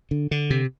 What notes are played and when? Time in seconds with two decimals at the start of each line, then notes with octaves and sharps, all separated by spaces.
0.11 D3
0.31 D3
0.50 C3